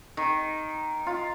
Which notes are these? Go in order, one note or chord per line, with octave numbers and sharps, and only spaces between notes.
D#3
F4